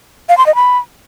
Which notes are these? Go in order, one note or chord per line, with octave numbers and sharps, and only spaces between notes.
F5
C6
D#5
B5